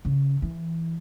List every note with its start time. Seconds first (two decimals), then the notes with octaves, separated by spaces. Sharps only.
0.05 C#3
0.42 E3